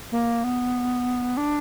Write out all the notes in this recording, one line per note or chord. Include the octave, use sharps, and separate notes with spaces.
A#3
B3
D4